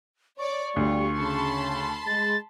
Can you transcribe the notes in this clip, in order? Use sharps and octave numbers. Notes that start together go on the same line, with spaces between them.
C#5 D5 C#6
D2 G3 F4
C#3 A5 B5 C6
G#3 A6